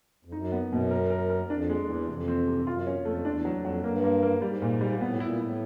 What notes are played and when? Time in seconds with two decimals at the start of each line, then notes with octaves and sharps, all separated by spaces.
0.25 F2
0.32 F#2 D#4
0.52 B3
0.62 F#2
0.72 B2
0.91 A#4
1.10 A#4
1.30 A#4
1.50 F2 D4
1.70 G#3
1.79 E2
1.89 E3
2.08 F2 C3
2.28 C4
2.47 G#2 C3
2.59 G2
2.67 F#2 F4
2.87 E2 C#4
2.96 F2
3.05 A3
3.25 E2 D4
3.45 F#3
3.54 F2
3.65 F#3
3.84 G2 A#3
4.04 A#3
4.23 A#3
4.38 G2
4.42 G#2 G3
4.62 A#2
4.81 G3
4.90 A#2
5.01 A2 B3
5.12 B2
5.20 A#2 E4
5.39 A2 E4